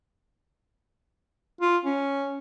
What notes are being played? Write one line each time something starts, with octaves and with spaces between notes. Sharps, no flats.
F4
C#4